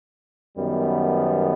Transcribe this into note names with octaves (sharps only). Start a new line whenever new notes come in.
F#2 D#3 G3 B3